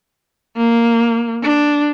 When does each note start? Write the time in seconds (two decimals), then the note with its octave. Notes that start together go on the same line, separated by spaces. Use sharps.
0.57 A#3
1.43 D4